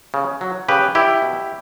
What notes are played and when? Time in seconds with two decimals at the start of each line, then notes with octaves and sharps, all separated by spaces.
0.14 C#3
0.41 F#3
0.68 C#3 G4 B4
0.95 E3 E4 G4
1.22 B2